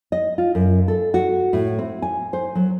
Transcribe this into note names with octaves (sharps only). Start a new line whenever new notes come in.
D#5
F4
F#2
A4
F#4
A2
C4
G#5
C5
F#3